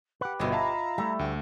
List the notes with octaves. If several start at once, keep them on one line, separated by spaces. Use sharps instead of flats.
G4 B4 F#5
G1 B2 E4 F4 C5 D#5
E5 F5 A5 A#5
G3 A3 E4
D2 G5